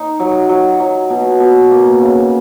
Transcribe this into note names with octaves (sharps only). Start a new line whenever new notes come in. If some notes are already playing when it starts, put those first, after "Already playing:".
Already playing: D#4
F#3
F#3
F#3
B2
B2
A#3
C#3